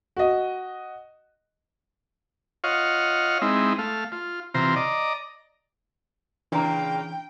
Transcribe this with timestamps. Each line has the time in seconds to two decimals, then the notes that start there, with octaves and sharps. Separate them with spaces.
0.17 F#4 D#5
2.64 F4 C#5 D#5 F5 F#5
3.42 G#3 C4 D#4 E4
3.78 A3 F5
4.12 F4
4.54 C3 E3 F4 C5 A#5
4.76 D5 D#5 A#5
6.52 A#2 C#3 E3 A#3 D4 G5 A#5